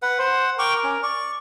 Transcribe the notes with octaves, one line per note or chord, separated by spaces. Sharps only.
B4 F#5
C5 F#5
A#4 G5 C#6 D6
C#4
D5 C#6